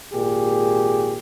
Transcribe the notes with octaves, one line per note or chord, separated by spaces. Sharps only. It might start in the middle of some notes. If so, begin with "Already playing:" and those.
G#1 A#2 G4 G#4